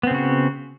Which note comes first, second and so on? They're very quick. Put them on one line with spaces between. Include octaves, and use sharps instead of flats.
B3 C4 C#3 F#4